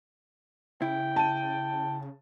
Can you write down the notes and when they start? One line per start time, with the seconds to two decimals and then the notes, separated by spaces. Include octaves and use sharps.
0.82 C#3 E4 G5
1.16 A5 D#7